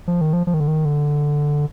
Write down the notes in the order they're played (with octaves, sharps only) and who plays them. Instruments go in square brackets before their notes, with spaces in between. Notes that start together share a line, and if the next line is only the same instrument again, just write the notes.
[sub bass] F3
D#3
F3
F3
D#3
D3
D#3
D3